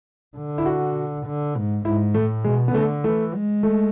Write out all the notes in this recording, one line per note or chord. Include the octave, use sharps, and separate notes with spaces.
D3
E4
F#4
D3
G#2
G#2 E4
A2 A3
B2 G#3
B3
D3 A3
E3 A3
G#3
A3